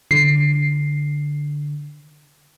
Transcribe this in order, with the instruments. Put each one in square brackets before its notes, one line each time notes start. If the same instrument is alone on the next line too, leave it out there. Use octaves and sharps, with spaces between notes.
[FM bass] D3 [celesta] C7